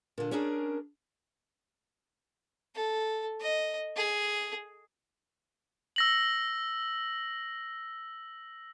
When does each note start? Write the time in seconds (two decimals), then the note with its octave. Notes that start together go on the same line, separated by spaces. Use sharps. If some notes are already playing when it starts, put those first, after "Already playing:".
0.18 A#2 D3
0.31 C#4 D4 G#4 A#4
2.75 A4
3.40 D#5
3.96 G#4
5.96 E6 A#6 F#7